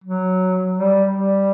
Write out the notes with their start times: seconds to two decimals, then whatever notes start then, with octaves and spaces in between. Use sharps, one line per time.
0.04 F#3
0.77 G3
1.14 G3